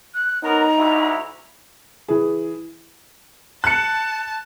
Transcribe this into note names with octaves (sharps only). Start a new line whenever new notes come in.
F#6
B3 C#4 D#4 A#4 A#5
D2 G#2 E4
E3 G#4
A5 F#6 C#7